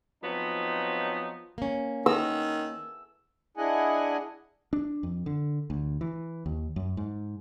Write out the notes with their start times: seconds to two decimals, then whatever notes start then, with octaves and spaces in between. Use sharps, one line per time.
0.23 F3 F#3 B3 C4 D#4
1.58 A#3 C#4
2.06 D#3 E6
3.57 D4 E4 G#4 D#5 F#5 G#5
4.73 D4
5.03 F2
5.26 D3
5.70 D2
6.01 E3
6.46 D#2
6.76 F#2
6.97 G#2